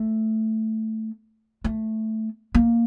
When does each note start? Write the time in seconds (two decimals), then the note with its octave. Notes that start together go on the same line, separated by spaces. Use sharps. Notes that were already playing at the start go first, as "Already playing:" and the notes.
Already playing: A3
1.64 A3
2.55 A#3